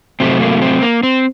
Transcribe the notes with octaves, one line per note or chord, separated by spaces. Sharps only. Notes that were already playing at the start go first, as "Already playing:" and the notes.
C3 F#3 A3 C4
A#3
C4
A#3
C4